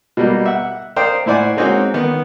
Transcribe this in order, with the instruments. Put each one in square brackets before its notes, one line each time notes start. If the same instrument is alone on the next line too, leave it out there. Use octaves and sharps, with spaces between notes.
[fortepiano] B2 G3 A#3
E5 F#5
A#4 C5 D5 D#5 F5 G5
A2 E4 C5 D5 F#5 G#5
G#3 A#3 C4 C#4 D#4 F#4
D#3 B3